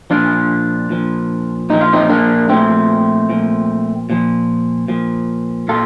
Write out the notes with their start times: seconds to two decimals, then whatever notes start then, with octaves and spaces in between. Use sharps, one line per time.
0.10 A#2 F3 D4 F4
0.90 A#2 F3
1.70 A#2 F3 D#4
1.81 F4
1.93 C4 D#4
2.09 A#3 D4
2.49 A#2 F3 A3 C4
3.30 A#2 F3
4.10 A#2 F3
4.88 A#2 F3
5.68 A#2 F4 A4